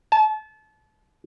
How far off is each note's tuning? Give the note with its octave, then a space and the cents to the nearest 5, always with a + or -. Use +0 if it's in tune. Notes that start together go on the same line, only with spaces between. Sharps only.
A5 -30